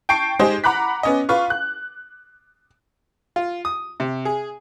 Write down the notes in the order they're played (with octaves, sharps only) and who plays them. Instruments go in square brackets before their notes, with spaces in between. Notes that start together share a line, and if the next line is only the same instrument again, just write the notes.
[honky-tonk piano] G5 A5 C#6 C7 D7
G#3 D#4 G4 G#4 C5 D#5
F#5 A#5 B5 D6 F#6 B6
B3 C#4 D#5
F4 B4 F5 C#6
F#6
[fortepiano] F4
D#6
C3
G#4